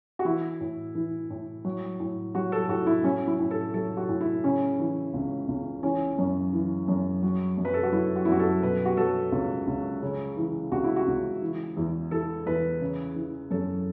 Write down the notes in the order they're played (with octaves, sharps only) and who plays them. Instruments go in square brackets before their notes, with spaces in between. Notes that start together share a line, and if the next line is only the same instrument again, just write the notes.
[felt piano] F#4
E3 E4
A2
E3
A2
F#3
A2
F#3 F#4
A4
A2 F#4
E4
F#3 C#4
E4
A2
A4
F#3 A4
F#4
A2
E4
C#3 C#4
E3
C#2
C#2
E3 C#4
F#2
E3
F#2
F#3
F#2
B4
A4
F#4
F#3 E4
F#4
E4
F#2 F#4
A4
B2 B4
F#4
F#3 A4
C#2
C#2
C#3
E3
C#2 F#4
E4
F#4
C#2
E3
E2
E3 A4
E2 B4
C#3
E3
F#2 A4